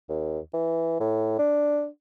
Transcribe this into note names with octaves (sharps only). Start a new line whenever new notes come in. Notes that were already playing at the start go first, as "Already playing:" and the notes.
D#2
E3
A2
D4